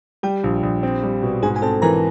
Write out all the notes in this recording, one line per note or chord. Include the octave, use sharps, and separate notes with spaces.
G3 G4 G5
A#1
A#1
C4
G3
B2
G#2 G#4 G#5
G#5
C4 A4 A5
E3 A#4 A#5